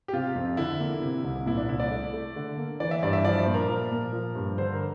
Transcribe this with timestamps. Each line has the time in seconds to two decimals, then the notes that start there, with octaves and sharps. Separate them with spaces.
0.08 G4
0.13 C3 F4
0.35 F2
0.57 D3 E4
0.80 A#3
1.02 C3
1.25 C2
1.46 A#2 E4
1.57 D4
1.69 C2 E4
1.80 D5
1.91 A3
2.13 A3
2.36 D3
2.57 A#3
2.80 E3 D5
2.91 E5
3.03 G2 D5
3.13 E5
3.24 F3 D5
3.39 C5
3.47 A#2
3.54 A#4
3.69 F3 A#4
3.91 A#2
4.13 F3
4.35 G2
4.58 D3 C5
4.73 A#4